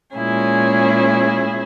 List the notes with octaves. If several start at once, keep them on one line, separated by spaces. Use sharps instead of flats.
A#2 G#3 C#4 E4 G#4